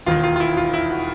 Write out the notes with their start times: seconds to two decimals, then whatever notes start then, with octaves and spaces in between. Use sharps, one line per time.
0.06 E1 D#2 D#3 F4
0.24 F4
0.36 F4
0.40 E4
0.57 F4
0.73 E4
0.90 F#4